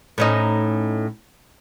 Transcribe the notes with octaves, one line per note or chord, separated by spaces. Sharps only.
A2 C#4 D#4